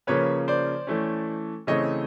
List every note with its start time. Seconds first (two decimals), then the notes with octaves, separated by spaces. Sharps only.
0.07 C#3 F3 A#3 C#4 B4 C#5
0.48 C5 D5
0.87 E3 A3 C#4
1.67 C#3 E3 A3 C4 C#5 D#5